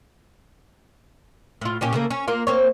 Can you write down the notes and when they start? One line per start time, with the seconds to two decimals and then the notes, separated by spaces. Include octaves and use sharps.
1.61 A2 F4
1.81 A#2 C#4 G4
1.93 C#3 A3 A#3
2.10 C#4
2.28 A#3 F4
2.47 A#3 C4 C#5